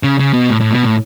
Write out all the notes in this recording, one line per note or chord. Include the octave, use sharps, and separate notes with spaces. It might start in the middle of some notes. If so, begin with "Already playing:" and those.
C#3
C#3
B2
A2
A2
B2
A2